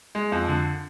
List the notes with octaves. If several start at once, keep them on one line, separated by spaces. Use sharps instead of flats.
G#3
F2
D3